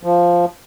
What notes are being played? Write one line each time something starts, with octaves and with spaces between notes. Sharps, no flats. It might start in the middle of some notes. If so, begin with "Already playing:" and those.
F3